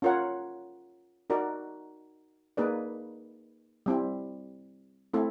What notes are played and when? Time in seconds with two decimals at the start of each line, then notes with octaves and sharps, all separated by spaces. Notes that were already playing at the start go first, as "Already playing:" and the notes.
0.02 C#4 F4 A#4 C#5 F#5
1.30 D#4 F#4 A#4 D5
2.57 A#3 D#4 G#4 B4 D5
3.86 G3 C4 E4
5.14 A3 C4 E4 A4